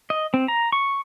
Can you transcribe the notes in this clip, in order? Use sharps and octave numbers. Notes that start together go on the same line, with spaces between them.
D#5
C4
A#5
C#6